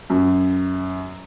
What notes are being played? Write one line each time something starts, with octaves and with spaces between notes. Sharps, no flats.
F#2